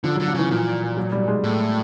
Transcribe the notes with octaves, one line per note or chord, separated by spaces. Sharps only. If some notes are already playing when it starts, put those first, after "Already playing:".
D3 F3
F#3
D3
F3
C#3 E3
A#2 F3
F#3
G3
G#3
A2